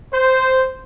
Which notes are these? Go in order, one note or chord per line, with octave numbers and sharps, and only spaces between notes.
C5